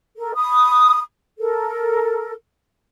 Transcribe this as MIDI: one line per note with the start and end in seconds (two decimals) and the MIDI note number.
0.17 0.33 69
0.17 0.33 70
0.35 1.00 83
0.35 1.00 87
1.40 2.32 69
1.40 2.32 70